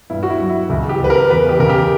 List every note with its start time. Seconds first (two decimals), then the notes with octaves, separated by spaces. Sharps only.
0.10 G2 E4
0.23 F#4
0.30 E4
0.41 F#3
0.49 E4
0.69 C#2 E4
0.89 G4
0.99 C#2
1.04 B4
1.10 A#4
1.29 E2 B4
1.49 G4
1.59 C#3 A#4
1.69 G4